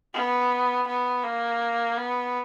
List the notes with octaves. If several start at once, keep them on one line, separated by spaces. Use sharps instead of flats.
B3
B3
A#3
B3